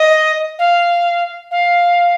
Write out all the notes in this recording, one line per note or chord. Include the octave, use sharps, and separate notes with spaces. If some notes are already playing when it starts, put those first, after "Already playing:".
Already playing: D#5
F5
F5